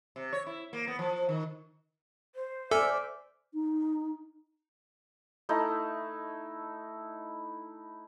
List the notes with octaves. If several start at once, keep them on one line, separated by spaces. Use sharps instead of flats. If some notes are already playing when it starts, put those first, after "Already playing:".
C3
C#5
E4
A#3
B3
F3
D#3
C5
A4 D5 E5 G#5 F6
D#4
A3 D#4 E4